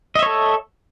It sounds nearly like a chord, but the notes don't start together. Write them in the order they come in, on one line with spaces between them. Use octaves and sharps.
D#5 E5 C#5 A4